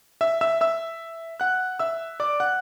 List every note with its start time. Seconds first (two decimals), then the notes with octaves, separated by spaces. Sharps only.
0.21 E5 E6
0.41 E5 E6
0.61 E5 E6
1.40 F#5 F#6
1.79 E5 E6
2.20 D5 D6
2.40 F#5 F#6